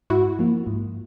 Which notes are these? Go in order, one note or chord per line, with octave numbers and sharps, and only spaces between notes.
G#2 E4 F#4
F3 A#3
G#2